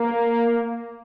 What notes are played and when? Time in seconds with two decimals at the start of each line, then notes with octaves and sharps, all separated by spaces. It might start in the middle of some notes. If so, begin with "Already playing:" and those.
Already playing: A#3